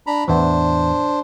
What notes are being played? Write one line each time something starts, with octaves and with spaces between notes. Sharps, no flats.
D4 A#5 B5
E2 A2 E3 D4 C5